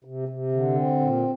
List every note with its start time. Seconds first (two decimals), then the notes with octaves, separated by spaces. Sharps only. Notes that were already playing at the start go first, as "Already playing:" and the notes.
0.05 C3
0.29 C3
0.52 D3
0.75 C4
1.00 A#2